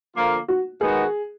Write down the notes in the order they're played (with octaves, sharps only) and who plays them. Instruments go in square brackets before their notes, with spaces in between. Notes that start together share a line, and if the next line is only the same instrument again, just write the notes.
[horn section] D3 F3 A#3 F4 A#4
[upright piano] F#4
[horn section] D#3 G#3 B3 D#4 F#4 [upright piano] G#4